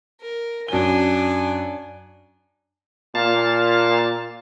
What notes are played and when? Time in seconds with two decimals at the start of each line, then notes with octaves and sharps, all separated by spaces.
0.21 A#4
0.68 F#2 D4 G#5 G7
3.15 A#2 F5 A5